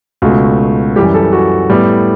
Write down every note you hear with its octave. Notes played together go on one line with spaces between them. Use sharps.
C#2 B2 A3 F#4
F#2 E3 G3 G4
A4
F#4
A2 G3 B3